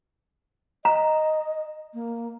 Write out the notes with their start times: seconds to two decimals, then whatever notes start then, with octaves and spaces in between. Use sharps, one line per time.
0.85 D#5 A#5
1.94 A#3